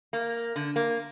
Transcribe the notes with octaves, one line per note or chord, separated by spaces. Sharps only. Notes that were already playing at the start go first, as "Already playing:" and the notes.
A#3
D3
A#3